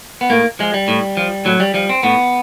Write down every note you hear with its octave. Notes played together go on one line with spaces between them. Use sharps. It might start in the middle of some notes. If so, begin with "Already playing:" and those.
B3
A2 A#3
F3 G#3
G3
A2
F3
A2 F#3
G3
F3 G3
C4
A2 B3